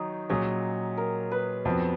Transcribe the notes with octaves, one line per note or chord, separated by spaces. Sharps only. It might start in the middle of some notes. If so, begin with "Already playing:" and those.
Already playing: D#3 F#3 D#4
A#2 F#3 C#4 G#4
A#4
B4
F2 F3 B3 F#4